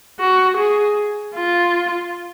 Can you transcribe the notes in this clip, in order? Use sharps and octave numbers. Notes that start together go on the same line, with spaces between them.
F#4
G#4
F4